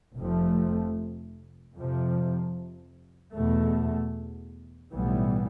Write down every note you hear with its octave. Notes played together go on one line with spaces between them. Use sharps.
F1 F2 C3 F3 A3
F2 C3 F3
E2 B2 A3
B1 A2 E3 G3 B3